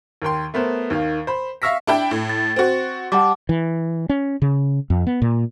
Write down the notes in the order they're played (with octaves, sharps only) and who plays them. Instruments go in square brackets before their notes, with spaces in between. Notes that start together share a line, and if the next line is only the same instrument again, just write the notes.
[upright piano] D#2 A#4 G5 C6
A3 B3 A#4 C5
D#2 D#3 F5
C5 B5
E5 F5 C#6 E6 A#6 B6
[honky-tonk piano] D4 E4 G5
A2
[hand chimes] A6
[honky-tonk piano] C4 F#4
[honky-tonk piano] G3 [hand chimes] F#5 A5 D6
[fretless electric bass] E3
C#4
C#3
F2
B3
A#2